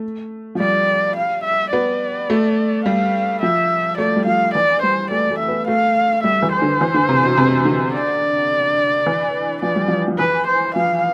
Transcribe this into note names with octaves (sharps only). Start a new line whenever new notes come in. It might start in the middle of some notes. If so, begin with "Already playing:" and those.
Already playing: A3
F3
G3 D5
F5
E5
B3 D5
A3
G3 F5
F3 E5
A3 D5
G3
F3 F5
E3 D5
G3 C5
A3 D5
A3
E5
B3
A3 F5
G3 E5
E3
C5
D3
E3
D3
C3
B2
C3
D3
D5
E3
F3 D5
G3
F3
F3
E3 B4
C5
F3 F5